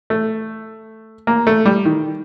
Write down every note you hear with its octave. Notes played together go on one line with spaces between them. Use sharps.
A3
A#3
A3
G3
D#3